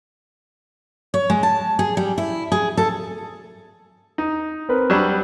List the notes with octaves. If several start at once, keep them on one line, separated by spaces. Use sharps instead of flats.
C#5
G#3
A5
G#4
G3
E4
G#4
A4
D#4
C4 A#4 B4
F#3 G3 D4 B4 E7